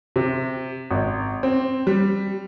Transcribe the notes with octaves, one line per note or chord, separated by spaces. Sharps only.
C3
G#1
C4
G3